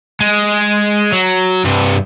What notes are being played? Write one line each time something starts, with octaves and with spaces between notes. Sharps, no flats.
G#3
F#3
G2 C3